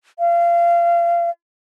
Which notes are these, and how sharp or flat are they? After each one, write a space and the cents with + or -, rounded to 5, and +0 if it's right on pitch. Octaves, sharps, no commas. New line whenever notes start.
F5 -30